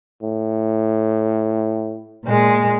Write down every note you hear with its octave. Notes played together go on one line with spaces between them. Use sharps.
A2
A#2 G#3